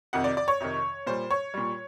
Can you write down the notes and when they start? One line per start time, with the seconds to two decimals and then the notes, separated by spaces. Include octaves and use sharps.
0.13 F2 C3 D#3 F#5
0.24 D5
0.37 D5
0.48 C#5
0.60 F2 C3 D#3
1.07 A#2 G3 C5
1.31 C#5
1.54 A#2 G3